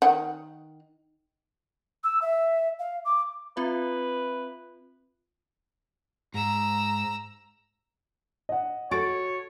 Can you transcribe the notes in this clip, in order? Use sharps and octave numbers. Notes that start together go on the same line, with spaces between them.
D#3 F#5
E6
E5
F5
D6
C4 F4 B4 E5
G#2 A#5 E6
D#5 F#5
F#4 A4 C#5 C#6 A6 D7